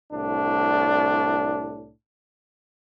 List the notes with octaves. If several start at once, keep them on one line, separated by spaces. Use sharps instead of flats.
C2 A2 D4